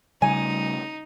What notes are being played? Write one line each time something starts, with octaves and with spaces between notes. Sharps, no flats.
C#3 G3 A3 D#4 G#5